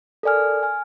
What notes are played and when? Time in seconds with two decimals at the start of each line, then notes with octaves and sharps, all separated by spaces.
0.23 A4 A#4 D5 G#5 F6
0.63 G#5 F6